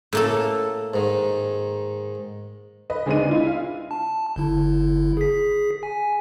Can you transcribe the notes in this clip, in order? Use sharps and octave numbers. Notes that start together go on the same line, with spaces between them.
A2 A#3 A4
G#2 D#3
B4 D#5
D2 G#3 C4 D4 D#4 D#7
E4 F4 D#5
F5
A5
G1 D3 E4
G#4 B6
G#5